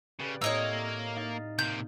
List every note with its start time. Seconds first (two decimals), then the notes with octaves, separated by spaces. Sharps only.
0.20 C#3 G4 B4 D5
0.42 A2 A#3 C4 A#4 C#5 D#5 E6
1.16 D#4 F5 A6
1.59 C3 A#3 G6